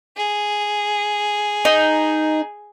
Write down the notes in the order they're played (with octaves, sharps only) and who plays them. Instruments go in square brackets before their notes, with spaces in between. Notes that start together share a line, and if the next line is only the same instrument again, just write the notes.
[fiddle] G#4
[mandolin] D#4